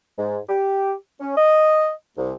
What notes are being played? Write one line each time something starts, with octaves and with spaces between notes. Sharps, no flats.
G#2
G4
C#4
D#5
C2